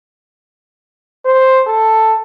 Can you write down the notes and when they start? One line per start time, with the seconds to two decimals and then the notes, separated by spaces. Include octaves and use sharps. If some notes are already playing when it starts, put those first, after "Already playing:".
1.25 C5
1.67 A4